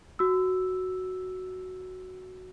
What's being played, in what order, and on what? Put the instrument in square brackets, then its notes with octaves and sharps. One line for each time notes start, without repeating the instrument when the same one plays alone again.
[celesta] F#4 E6